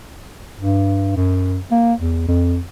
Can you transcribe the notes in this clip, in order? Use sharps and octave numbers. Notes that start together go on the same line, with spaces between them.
G2
F#2
A#3
E2
F2